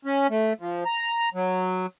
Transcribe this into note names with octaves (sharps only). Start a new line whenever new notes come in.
C#4
A3
F3
A#5
F#3